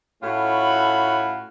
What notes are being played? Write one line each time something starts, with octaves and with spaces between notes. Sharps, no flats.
A2 A3 C#4 F4 F#4 B5